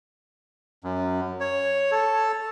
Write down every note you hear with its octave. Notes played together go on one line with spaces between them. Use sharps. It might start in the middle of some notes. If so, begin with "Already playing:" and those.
F#2
C#5
A4